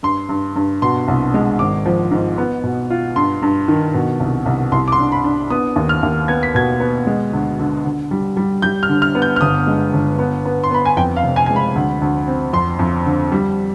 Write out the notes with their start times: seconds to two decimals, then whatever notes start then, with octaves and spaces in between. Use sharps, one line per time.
0.03 G2 C6
0.29 G2
0.56 G2
0.82 B2 C6
1.08 C2
1.34 G#3
1.59 G#1 D6
1.86 F3
2.11 G#2
2.38 B3
2.64 B2
2.90 F4
3.16 G2 C6
3.42 G2
3.68 D#3
3.94 B2
4.20 C2
4.46 C2
4.72 C2 C6
4.88 D6
4.92 C6
4.99 D4
5.12 B5
5.24 D4
5.50 B3 D#6
5.76 D#2
5.89 F6
6.03 D#2
6.28 B3 G#6
6.43 B6
6.55 B2 G#6
6.80 B3
7.07 G#3
7.33 D2
7.59 D3
7.85 D3
8.11 G3
8.37 G3
8.62 G3 G6
8.83 F6
8.89 D3
9.02 F6
9.15 B3
9.22 G6
9.36 F6
9.41 G1 D#6
9.67 G#3
9.93 G1
10.19 B3
10.45 B3
10.64 C6
10.71 B3 B5
10.86 G#5
10.97 F2 G5
11.16 F5
11.23 F1
11.36 G#5
11.46 G#3 G#5
11.56 B5
11.75 D2
12.01 D2
12.28 C4
12.53 F2 C6
12.79 F2
13.06 D3
13.32 G3